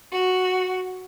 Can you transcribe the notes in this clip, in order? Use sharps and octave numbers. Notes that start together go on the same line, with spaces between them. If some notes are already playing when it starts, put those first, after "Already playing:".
F#4